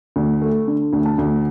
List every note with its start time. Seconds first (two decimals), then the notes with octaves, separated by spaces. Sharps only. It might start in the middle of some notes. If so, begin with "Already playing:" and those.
0.16 D2
0.41 A3
0.67 D3
0.93 D2
1.06 A5
1.18 D2